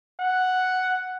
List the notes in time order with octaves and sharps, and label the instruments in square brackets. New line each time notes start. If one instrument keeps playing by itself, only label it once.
[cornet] F#5